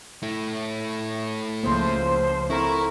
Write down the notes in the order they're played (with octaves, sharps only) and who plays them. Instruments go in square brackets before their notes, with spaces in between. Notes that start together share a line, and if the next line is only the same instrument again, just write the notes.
[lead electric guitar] A3 E4
[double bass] C#2 F3 [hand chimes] A#3 [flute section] C5
[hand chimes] C4 A4 A#5 [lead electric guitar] E4 [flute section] A#4 C#6